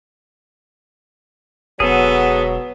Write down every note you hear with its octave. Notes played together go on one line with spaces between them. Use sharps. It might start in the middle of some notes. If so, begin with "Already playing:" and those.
E1 F#3 B3 G#4 A4